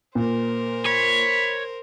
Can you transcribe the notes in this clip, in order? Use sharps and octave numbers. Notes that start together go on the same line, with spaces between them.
A#2 A#4 C5
C#5 B5